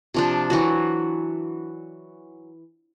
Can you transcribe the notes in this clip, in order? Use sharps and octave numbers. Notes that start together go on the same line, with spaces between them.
C3 F3 D4
E3 F#3 F#4